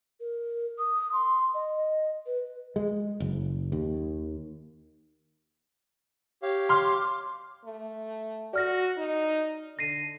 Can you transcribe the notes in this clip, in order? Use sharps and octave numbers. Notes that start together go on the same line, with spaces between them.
A#4
D#6
C6
D#5
B4
G#3
F#1
D#2
G4 C#5 F5
C6 D6 F6
A3
F#4 D5 F6 A#6
D#4
D3 A#6 C7 D#7